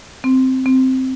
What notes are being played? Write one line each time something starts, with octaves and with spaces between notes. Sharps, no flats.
C4
C4